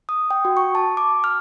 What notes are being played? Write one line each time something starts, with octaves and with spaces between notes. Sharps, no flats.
D#6
G5
F#4
C#6
A5
D6
F6